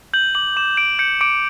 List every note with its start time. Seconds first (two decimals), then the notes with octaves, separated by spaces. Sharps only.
0.14 G6 F#7
0.35 D6 F#7
0.56 D6 E7
0.77 G6 D7
0.99 G6 C#7
1.21 D6 D7